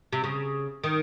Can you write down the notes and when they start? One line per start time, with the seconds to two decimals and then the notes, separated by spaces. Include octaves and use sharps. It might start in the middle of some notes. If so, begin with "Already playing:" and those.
0.13 C3
0.24 C#3
0.84 D#3